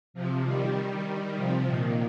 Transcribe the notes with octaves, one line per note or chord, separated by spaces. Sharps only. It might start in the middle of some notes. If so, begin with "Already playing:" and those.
C3 F3
D#3 G3
C3 F3
A#2 D#3